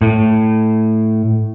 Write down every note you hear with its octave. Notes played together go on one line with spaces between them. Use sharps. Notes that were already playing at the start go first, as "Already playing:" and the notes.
A2